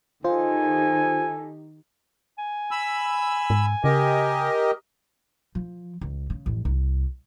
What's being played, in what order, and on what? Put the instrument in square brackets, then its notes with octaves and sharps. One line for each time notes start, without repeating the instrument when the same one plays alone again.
[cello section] D#3 D#4 G4 [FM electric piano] F4 C5 [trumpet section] A4 G#5
[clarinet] G#5
[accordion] B5 E6
[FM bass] G#2
[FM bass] C#3 [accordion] G4 A#4 D#5
[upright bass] F3
C#2
C#3
A1 F2
C2